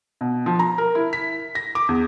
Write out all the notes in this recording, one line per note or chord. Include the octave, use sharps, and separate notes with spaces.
B2
F3
A#5
A#4
E4
B6
A#6
D6
E2